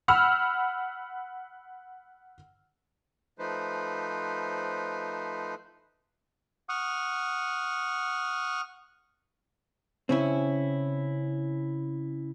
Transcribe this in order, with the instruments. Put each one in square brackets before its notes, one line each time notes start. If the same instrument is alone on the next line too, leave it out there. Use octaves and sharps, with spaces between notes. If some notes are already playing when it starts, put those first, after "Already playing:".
[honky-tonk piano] F#5 B5 E6 F6
[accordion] F3 A3 D#4 B4 C5
[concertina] F#5 C#6 D#6 F6
[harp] C#3 [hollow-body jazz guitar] C4 C#4 E4